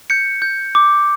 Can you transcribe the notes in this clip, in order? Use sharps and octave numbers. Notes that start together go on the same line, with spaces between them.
G6 C#7
G6
D6